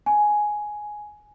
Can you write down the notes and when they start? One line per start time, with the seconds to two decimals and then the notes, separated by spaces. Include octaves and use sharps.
0.06 G#5